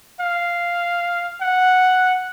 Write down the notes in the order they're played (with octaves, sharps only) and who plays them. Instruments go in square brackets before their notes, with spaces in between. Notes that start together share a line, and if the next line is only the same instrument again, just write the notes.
[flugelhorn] F5
F#5